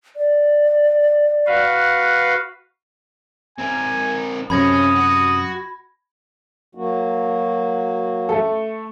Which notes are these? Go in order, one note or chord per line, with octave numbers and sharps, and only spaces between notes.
D5
F#4 B4 F5
C4 A#4 G#5
F#2 C3 C#4 B5 D#6 G#6 A#6
F#4
F#3 A#3 F#4
A3 A4